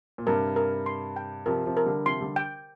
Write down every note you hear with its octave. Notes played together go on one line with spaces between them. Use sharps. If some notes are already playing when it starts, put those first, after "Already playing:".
A#2
G2 C3 A#4
A#4
C6
G5
C3 F3 A#4
C3 F3
A#4
D3 G3
C3 F3 C6
D3 G3
G5